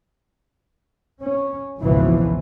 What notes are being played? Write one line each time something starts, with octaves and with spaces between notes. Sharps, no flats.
C#4
G#1 C#2 B2 E3 F3